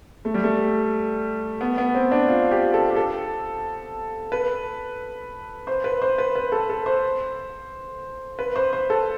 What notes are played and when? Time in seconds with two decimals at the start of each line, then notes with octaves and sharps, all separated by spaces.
0.25 A3
0.34 G3
0.44 A3
1.61 B3
1.78 B3
1.95 C4
2.12 D4
2.28 F4
2.51 G4
2.74 A4
2.91 G4
2.96 A4
4.32 B4
5.67 C5
5.84 B4
6.02 C5
6.18 B4
6.35 B4
6.52 A4
6.69 A4
6.86 C5
8.39 B4
8.56 C5
8.73 C5
8.90 A4